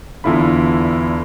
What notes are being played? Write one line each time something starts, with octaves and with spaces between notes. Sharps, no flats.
E2 D3 E4 F4 B5